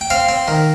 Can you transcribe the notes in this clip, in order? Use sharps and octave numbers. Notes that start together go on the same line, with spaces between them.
G5
C4 F5
C4
D#3